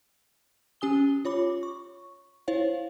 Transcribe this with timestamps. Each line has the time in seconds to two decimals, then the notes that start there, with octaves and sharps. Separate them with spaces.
0.81 C#4 G4 G#5 D#6 G7
1.25 F4 C#5 B5 D6
1.63 C#6
2.48 E4 C5 C#5 F5